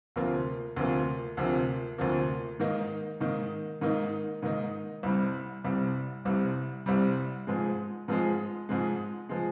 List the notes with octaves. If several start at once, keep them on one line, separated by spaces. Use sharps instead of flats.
D2 C3 F3 A#3
D2 C3 F3 A#3
D2 C3 F3 A#3
D2 C3 F3 A#3
G#2 D#3 A#3 D#4
G#2 D#3 A#3 D#4
G#2 D#3 A#3 D#4
G#2 D#3 A#3 D#4
C2 C3 G3
C2 C3 G3
C2 C3 G3
C2 C3 G3
G#2 F3 G#3
G#2 F3 G#3
G#2 F3 G#3
F3 G#3